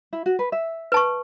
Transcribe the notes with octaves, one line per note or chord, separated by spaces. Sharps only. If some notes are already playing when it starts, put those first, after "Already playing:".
E4
F#4
B4
E5
B4 A5 C#6